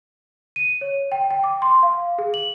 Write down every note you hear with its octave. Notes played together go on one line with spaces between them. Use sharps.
D#7
C#5
G5
G5
D6
C6
F5
G#4
F#7